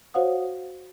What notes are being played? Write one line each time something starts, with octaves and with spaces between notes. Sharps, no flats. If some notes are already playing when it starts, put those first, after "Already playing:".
F#4 C5 C#5 F5 F#5 D#6